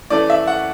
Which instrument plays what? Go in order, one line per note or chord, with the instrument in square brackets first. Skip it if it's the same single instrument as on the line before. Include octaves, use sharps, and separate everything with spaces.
[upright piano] E3 A3 C#4 D5
E5
F#5